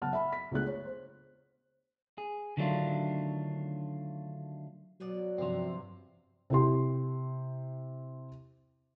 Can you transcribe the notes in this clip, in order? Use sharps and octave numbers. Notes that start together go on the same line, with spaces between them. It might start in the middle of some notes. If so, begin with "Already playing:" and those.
F#1 B3 F#5 A5 F6
E5 B5
B6
C#2 A3 B3 D4 G#4 F#6
C#5
C5
G#4
D3 D#3 F#3 A3 D4 F4
B2 F#3 B3 D5
G1 C3 F3 C4 C6
C3 E4 G4 C6